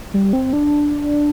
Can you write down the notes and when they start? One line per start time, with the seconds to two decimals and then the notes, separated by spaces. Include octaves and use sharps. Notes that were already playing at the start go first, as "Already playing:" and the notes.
0.14 G3
0.33 C4
0.53 D4